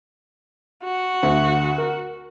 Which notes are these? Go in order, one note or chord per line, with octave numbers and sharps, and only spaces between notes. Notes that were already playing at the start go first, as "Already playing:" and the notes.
F#4
D2
A#4